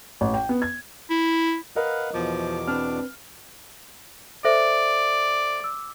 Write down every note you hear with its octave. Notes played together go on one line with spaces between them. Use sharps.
A1
G5
B3
G#6
E4
A#4 B4 D#5 F5 F#5
E2 B2 F3 D6
C4 D4 B4 F6
A4 C5 D5 E5
D6 E6